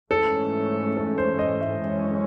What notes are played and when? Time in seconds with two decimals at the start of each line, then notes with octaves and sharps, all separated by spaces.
0.10 G#2 E3 A3 C#4 A4
0.97 A4
1.18 C5
1.39 D#5
1.61 E5
1.82 F#2 E3 G#3 C#4